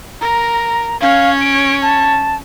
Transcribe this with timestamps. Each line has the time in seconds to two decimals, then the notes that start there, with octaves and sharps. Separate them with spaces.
0.21 A#4 A#5
1.01 C#4 C#5 F5
1.41 D7
1.82 A5